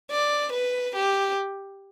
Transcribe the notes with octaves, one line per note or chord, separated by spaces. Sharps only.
D5
B4
G4